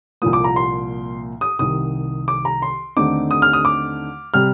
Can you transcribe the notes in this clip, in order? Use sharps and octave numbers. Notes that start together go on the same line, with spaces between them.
C2 A#2 F3 A#3 D#6
D6
A#5
C6
D#6
C2 C3 D#3 D#6
D6
A#5
C6
D#2 D3 A3 C4 D#4 D6
D#6
F6
D#6
D6
C3 G3 F6